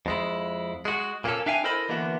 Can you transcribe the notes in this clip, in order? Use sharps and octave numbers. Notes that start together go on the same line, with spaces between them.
F2 G#3 E4
G#3 F#4
A#2 A#3 C4 C#4 A4
D4 E5 F5 G5 G#5
E4 A4 A#4 C5 D#5 B5
D3 E3 A#3 B3 F#4